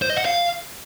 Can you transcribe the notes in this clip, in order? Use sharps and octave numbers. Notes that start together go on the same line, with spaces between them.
C5
D#5
F#5
F5